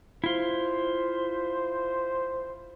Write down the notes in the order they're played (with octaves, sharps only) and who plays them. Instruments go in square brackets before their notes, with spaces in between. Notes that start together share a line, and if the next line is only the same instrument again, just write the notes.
[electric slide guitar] E4 F4 [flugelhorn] C5